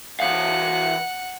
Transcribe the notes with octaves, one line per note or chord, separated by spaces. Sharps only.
E3 F5 F#5